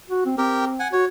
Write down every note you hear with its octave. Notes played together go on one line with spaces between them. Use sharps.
F#4
C4
C4 G4 A#4
F#5 G#5
F#4 C#5